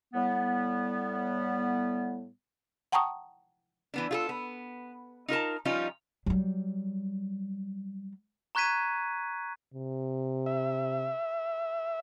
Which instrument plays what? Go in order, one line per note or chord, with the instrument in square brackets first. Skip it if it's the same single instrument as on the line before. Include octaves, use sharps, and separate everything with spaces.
[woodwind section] A2 G3 B3
[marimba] F#5 G5 A5 A#5 C#6 D#6
[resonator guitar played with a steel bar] E3 B3 D4
F4 G#4 A4
B3
D#4 F4 A#4 A5
F3 G3 C#4 D#4 F4
[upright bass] F#3 G3
[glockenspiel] A#5 C#6 F#6 G#6 B6 D#7
[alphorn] C3
[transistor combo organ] E5